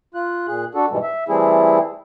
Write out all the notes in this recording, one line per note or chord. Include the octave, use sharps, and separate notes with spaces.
F4 F#6
A#2 G#4 F#6
D4 F#4 A4
G#2 B2 E3 G3 G#3
E5
E3 G3 A3 C4 E4 G#4